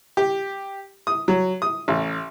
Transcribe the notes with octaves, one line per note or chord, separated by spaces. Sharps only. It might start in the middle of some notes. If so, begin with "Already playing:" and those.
G4
D#6
F#3
D#6
A1